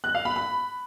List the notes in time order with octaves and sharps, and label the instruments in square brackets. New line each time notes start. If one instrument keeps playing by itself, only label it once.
[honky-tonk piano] F#6
F5
B5
B5